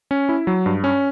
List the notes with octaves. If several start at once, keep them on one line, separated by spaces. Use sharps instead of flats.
C#4
E4
F#3
G2
C#4